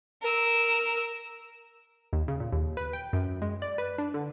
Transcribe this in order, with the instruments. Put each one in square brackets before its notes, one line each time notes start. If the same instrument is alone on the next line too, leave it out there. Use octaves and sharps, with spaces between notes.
[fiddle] A#4 E6
[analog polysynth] D#2
C#3
A#2
D#2
B4
G5
F#2
G#3
D5
B4
D4
D3